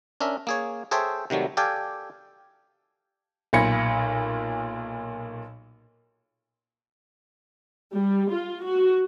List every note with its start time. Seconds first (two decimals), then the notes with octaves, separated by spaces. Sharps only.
0.21 C#4 D4 A#4 E5
0.47 A#3 G#4 C#5
0.91 G#4 A4 C5 C#5 E5 G5
1.30 C3 D#3 F#3 G3 A3
1.57 G4 A4 D5 F5 G5 G#5
3.53 B1 A#2 B5 G#6 A#6 C#7
7.94 G3
8.32 F4
8.64 F#4